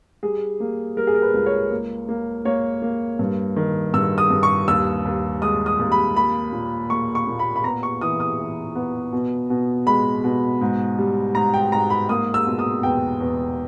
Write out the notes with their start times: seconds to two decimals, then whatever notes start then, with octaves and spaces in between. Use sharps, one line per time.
0.23 G3 G#4
0.60 A#3
0.97 G3 A#4
1.07 G#4
1.14 A#4
1.22 B4
1.34 C#2
1.46 C#5
1.71 A#3
2.09 A#3
2.45 A#3 C#5
2.82 A#3
3.19 G2
3.56 D#3
3.94 G2 E6
4.18 D#6
4.30 G2
4.43 C#6
4.68 D#2 E6
5.05 D#2
5.42 G#3 D#6
5.66 D#6
5.79 D#2
5.92 B5
6.16 A#3 B5
6.53 A#2
6.90 A#3 C#6
7.15 C#6
7.27 A#2
7.39 B5
7.56 B5
7.64 B3 A#5
7.83 C#6
8.01 E3 D#6
8.20 D#6
8.39 E3
8.75 B3
9.13 B2
9.50 B2
9.87 G#3 B5
10.24 B2
10.61 G#2
10.99 G3
11.35 G#2 A#5
11.54 G5
11.72 G#2 A#5
11.90 B5
12.09 A#3 D#6
12.34 E6
12.46 B2
12.59 D#6
12.83 E2 G5
13.20 E2